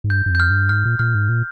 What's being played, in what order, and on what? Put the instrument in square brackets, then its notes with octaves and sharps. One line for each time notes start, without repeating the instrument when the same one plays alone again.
[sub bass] G#2
[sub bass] G2 [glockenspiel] G6
[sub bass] G2
[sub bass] F2 [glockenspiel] G6
[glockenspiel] F6
[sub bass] G2
[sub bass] G#2 [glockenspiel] F6
[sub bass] A#2
[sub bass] A#2 [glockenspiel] F6
[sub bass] G#2
A#2